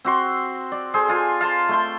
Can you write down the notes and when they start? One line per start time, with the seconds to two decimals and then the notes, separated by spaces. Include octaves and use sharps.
0.05 C4 F#4 C6
0.72 D5
0.94 G#4 A4 C5
1.08 F4 G#5
1.41 F5 A5 A#5 C6
1.69 A3 G5 C6